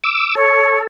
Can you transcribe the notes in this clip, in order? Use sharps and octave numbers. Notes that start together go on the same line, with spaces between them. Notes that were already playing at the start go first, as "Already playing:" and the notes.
D6 E6
A4 C#5